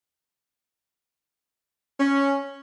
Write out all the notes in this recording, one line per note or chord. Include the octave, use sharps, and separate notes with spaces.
C#4